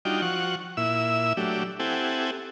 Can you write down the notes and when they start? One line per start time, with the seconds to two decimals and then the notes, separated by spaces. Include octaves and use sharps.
0.05 G3 D4 D#4 F4 F#4 G5
0.22 F3 F#4 F#5 C#6
0.77 A#2 E4 E5 E6
1.37 F#3 A3 D4 G4
1.79 C4 E4 G4 A4 F#5 G#5